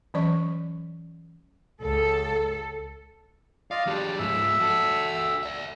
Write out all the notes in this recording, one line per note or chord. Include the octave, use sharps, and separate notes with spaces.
E3 F#3 C#4 D5 D#5 C#6
C#2 A4
F4 D5 D#5 F5
F#3 D4 G4 D5
G#2 F3 E5 E6
F#4 A4
D5 E5